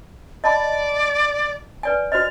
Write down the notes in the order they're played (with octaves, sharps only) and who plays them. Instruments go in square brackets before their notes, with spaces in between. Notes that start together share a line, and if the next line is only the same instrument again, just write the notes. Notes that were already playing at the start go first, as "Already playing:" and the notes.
[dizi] D5 [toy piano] D#5 A5 B5
[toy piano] B4 D5 G#5
[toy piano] F#4 C5 D#5 [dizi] F6